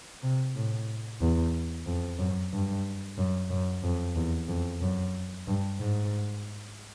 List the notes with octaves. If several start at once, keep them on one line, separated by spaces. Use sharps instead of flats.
C3
A2
E2
F2
F#2
G2
F#2
F#2
F2
E2
F2
F#2
G2
G#2